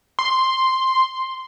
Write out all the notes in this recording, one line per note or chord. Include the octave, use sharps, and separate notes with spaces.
C6